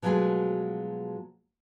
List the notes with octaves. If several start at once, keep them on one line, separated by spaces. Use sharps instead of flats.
B2 F3 F#3 G#3 A3 G#4